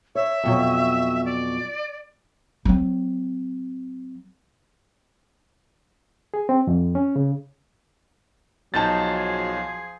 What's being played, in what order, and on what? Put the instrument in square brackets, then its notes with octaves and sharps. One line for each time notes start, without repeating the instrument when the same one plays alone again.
[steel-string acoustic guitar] C#5 [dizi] E5
[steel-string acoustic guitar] F2 B2 F#3
[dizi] D5
[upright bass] F#3 C4
[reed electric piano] G#4
C4
F2
C#4
C#3
[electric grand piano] B1 D#4 G6 [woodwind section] F3 G#4 [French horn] F#3 [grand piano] A5 A6